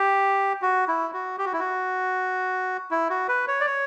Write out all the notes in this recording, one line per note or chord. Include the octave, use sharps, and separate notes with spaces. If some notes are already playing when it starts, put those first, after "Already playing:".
Already playing: G4
F#4
E4
F#4
G4
F#4
E4
F#4
E4
F#4
B4
C#5
D5
C#5